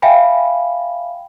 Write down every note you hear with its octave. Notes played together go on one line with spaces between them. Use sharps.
E5 F5 G5 G#5 B5